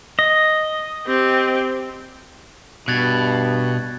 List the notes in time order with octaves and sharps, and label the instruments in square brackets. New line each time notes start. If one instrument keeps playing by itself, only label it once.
[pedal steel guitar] D#5
[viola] C4 G4
[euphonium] G2 [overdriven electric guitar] B2 [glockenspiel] F#6 G#6 A6